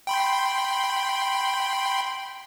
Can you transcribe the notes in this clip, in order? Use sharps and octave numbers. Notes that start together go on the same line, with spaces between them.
G5 B5 C6